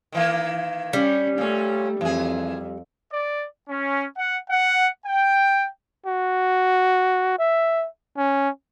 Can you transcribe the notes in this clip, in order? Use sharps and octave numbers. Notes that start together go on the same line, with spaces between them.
D#3 E3 A#3
G3 C#4
A#2 A3 C#4
F2 E3 G#4
D5
C#4
F#5
F#5
G5
F#4
E5
C#4